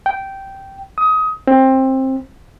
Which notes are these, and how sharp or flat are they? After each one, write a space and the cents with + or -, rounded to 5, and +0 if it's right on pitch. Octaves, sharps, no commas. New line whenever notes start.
G5 -10
D#6 +20
C4 +20